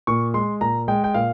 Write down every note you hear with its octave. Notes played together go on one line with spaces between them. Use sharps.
A#2 C#6
G#3 C6
A#2 A#5
G#3 G5
G5
A#2 F5